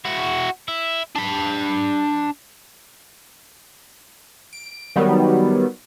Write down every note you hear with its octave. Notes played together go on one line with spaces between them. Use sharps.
E4 F#4
E4
D4 B5
D7
D#3 F#3 G3 B3